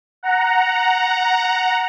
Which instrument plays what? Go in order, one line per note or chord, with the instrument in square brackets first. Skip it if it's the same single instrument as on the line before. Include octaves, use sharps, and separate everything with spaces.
[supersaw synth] F#5 A#5